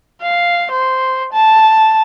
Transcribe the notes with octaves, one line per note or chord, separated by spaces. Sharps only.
F5
C5
A5